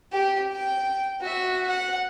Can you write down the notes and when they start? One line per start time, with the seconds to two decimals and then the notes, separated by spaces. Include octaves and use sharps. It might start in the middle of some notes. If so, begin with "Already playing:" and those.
0.12 G4
0.52 G5
1.21 F#4 E5
1.67 F#5